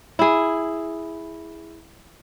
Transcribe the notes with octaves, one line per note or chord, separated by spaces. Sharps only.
E4 G#4